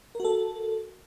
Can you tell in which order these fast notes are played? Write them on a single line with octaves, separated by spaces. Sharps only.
A#4 F#4 A4